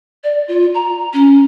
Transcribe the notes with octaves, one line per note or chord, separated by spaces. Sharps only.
D5
F4
A#5
C#4